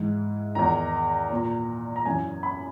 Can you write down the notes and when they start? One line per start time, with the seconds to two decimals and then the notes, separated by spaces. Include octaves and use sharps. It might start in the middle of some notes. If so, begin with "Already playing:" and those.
Already playing: G#2 E3
0.55 E2 D#3 A#5
1.30 A#2
1.96 A#5
2.06 F#2 E3 G#5
2.43 B5